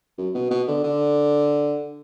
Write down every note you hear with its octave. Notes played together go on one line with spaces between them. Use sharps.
F#2
B2
B2
D3
D3